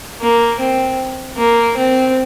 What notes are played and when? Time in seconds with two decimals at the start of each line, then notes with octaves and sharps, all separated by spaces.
0.21 A#3
0.60 C4
1.37 A#3
1.77 C4